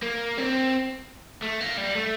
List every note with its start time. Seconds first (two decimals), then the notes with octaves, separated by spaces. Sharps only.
0.03 A#3
0.38 C4
1.42 A3
1.61 A#3
1.77 G3
1.95 A3